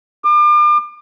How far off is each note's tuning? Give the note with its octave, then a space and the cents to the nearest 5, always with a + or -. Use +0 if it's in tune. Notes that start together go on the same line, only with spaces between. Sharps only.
D6 +40